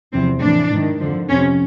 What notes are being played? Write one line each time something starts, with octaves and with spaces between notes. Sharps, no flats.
E2 C3 F3 C4
A2 E3 D4
G#2 D#3
F2 D3 F3
F2 C3 F3 C#4